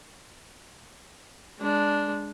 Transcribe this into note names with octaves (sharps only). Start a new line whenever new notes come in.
G#3 D4